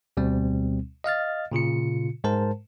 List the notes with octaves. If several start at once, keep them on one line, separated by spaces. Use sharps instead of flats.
D2 B2 G3 C4
D#5 F5 F6 A6
A#2 C#3 F4 C#7
G#2 G#3 A#4 C5 A5